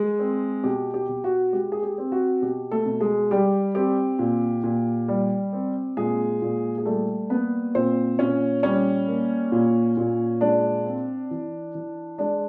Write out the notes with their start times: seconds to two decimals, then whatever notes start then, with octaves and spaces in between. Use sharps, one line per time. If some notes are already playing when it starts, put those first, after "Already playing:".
Already playing: G#3 G#4
0.19 C4
0.64 B2 G4
0.94 G4
1.08 B2
1.24 F#4
1.53 G#3 G4
1.72 G#4
1.83 G4
1.98 C4
2.12 F#4
2.42 B2 G4
2.71 A3 A4
2.86 B2
3.01 G#3 G#4
3.31 G3 G4
3.75 C4 G4
4.19 A#2
4.64 A#2
5.08 G3
5.53 C4
5.97 A#2 G#3 G#4
6.42 A#2
6.78 G#4
6.85 G3 A3 A4
7.30 A#3 B3 B4
7.75 A#2 C4 C5
8.19 A#2 C#4 C#5
8.63 G3 C#4 C#5
9.08 A#3
9.52 A#2
9.97 A#2
10.41 G#3 D4 D5
10.86 C4
11.31 E3
11.75 E3
12.18 G#3 D4 D5